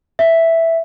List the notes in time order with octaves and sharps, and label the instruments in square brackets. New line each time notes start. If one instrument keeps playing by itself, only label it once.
[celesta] E5